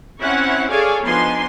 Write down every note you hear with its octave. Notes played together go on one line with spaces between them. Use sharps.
C4 C#4 E4 C#5 F#5
G#4 A4 C#5 D5 F5 G#5
F3 B3 D4 D#4 G#5 C6